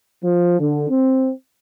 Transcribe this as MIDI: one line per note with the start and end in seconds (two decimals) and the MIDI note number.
0.24 0.58 53
0.60 0.87 50
0.89 1.32 60